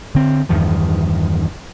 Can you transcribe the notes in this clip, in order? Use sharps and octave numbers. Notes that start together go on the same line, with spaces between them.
D3 C4
E2 G2 D#3 F3